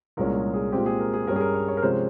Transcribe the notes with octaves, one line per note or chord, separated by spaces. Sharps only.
C2 A#2 G#3 C#4 A#4
G#4
G#4
A#2 G#3 C4 G4
G#4
A#4
G#4
G2 G3 C#4 A#4
G#4
A#4
C#5
C#5
A#4
C3 F3 G#3 C#4 C5